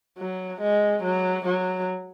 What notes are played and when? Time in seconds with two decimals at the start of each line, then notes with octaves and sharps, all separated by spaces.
0.19 F#3
0.61 G#3
1.03 F#3
1.46 F#3